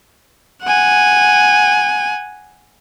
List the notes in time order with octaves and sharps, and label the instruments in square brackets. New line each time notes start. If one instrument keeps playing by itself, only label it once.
[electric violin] F#5 G#5